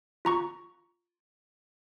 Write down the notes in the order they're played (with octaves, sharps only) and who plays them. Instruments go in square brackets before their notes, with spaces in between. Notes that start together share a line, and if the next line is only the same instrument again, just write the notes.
[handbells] F4 A#5 C#6